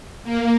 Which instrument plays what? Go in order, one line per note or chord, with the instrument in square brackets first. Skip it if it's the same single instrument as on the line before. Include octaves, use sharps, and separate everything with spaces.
[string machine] A#3